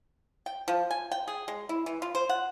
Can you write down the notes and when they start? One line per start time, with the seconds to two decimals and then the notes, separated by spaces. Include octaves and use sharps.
0.46 G5
0.68 F3
0.91 G#5
1.12 G5
1.28 G#4
1.48 G#3
1.69 E4
1.86 E3
2.02 F4
2.15 C5
2.29 F#5